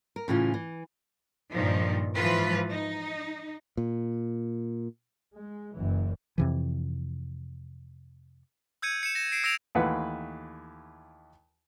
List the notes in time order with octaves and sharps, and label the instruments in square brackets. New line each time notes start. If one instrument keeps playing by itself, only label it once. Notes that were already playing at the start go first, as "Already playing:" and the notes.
[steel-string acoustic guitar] A#4
A2 C#3 E3 C#4 F4
E3
[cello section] G2 A#2 D#3 F3
G#2 E3 F3 F4 B4
D#4
[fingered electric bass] A#2
[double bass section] G#3
F#1 F#2 E3
[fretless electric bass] F2 C3 E3
[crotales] E6 G6 G#6 C#7 D#7
C#7 E7
A#6 E7
C7 D7 E7
E6 A#6 C#7 D7 F7
[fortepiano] D#2 E3 A3 F4 B4 F#5